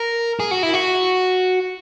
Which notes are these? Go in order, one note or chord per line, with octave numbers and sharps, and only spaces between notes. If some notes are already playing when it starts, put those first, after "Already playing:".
Already playing: A#4
G#4
F#4
E4
F#4